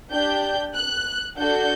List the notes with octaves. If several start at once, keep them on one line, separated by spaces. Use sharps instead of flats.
D4 G4 G6
F#6
D4 F#4 A4 G6